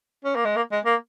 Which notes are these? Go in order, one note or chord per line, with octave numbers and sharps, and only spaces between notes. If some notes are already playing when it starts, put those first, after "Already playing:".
C#4
A#3
G#3
A#3
G#3
A#3